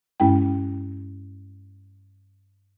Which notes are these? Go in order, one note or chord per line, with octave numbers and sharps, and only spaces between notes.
G2 G#3 C#4 E4 G5